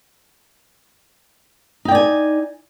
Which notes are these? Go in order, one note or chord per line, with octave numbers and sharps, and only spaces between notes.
D#4 D5 G5 G#5